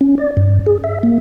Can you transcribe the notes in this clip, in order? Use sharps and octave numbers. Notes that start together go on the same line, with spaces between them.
C#4
D5
G2
G#4
E5
A#3